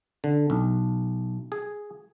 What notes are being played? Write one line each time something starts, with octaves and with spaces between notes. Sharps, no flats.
D3
B1
G#4